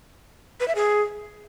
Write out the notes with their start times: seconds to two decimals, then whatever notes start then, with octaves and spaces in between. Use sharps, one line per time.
0.60 B4
0.68 E5
0.75 G#4